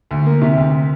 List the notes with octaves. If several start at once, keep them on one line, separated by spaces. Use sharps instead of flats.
D2
A#3
C3
D2